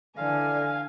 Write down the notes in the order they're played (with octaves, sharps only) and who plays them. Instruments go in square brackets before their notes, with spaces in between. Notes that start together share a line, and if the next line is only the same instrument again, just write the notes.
[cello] D3 [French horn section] E3 A4 D5 [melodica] F5 [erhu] G#5